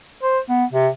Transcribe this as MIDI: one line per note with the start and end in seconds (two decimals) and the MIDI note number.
0.22 0.39 72
0.49 0.64 59
0.73 0.88 48